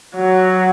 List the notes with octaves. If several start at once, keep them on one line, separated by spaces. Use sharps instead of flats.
F#3